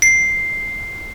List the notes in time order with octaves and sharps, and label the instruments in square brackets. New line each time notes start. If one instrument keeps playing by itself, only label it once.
[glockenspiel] C7